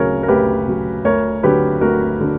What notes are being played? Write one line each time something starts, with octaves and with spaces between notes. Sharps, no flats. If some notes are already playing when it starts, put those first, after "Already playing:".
Already playing: D2 C#3 F#3 A#4 C#5
A#4
D2 G4 B4
C#3 F#3
D2 A#4 C#5
D3 F#3 G4 B4
D2 F#4 A#4
D3